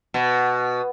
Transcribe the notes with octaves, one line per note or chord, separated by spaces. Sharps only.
B2